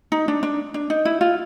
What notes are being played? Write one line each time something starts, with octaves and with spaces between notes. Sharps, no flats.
D#4
D4
D4
D4
D#4
E4
F4